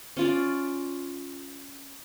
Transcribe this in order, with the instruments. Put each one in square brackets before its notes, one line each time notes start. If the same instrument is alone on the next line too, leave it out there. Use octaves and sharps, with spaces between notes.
[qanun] C#4 F4 D5